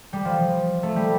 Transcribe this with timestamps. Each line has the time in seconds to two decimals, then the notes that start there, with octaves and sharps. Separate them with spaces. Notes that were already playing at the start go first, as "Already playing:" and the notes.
0.13 G3
0.25 F3
0.83 A3
0.96 G3